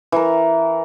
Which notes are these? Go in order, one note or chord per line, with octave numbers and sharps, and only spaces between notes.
E3 A#4